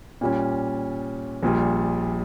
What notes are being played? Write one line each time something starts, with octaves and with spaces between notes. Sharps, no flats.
A#2 G3 C#4
A#1 A#2 G3